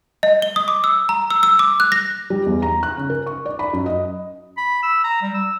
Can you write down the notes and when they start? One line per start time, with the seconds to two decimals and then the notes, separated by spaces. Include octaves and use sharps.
0.23 D#5
0.42 G7
0.56 D#6
0.68 D6
0.84 E6
1.09 A#5
1.30 E6
1.43 E6
1.59 D6
1.80 F#6
1.92 A#6
2.30 G3
2.46 E2
2.62 A#5
2.83 F#6
2.97 C#3
3.10 A#4
3.26 C#6
3.46 D5
3.59 B5
3.73 F#2
3.86 D#5
4.57 B5
4.83 E6
5.04 A#5
5.22 G3
5.34 E6